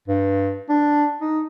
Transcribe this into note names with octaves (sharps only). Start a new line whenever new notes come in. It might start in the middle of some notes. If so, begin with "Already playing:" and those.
G2
D4
D#4